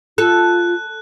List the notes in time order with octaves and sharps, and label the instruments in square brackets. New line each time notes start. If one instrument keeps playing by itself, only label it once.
[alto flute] F4 [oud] A4 [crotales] F#6